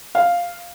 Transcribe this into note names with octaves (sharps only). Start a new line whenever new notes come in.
F5